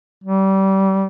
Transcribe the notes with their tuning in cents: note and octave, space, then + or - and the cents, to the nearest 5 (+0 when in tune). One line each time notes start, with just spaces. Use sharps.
G3 -25